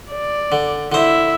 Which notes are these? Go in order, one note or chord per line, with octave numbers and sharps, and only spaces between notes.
D5
D3
D3 E4 C5 E5